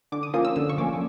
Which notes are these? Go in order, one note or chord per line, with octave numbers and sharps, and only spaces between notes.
D3 D6
D#6
F3 A#3 C#4 D#6
E6
D3 E6
C#6
F3 A#3 C#4 D6